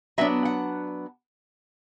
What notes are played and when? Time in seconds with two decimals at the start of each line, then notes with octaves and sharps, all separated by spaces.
0.18 F#3 B3 D4 E5
0.45 F#5